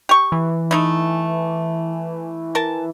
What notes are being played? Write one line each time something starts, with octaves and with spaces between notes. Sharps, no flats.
G4 C#6
E3
A3 D#4 E4
A#4 A5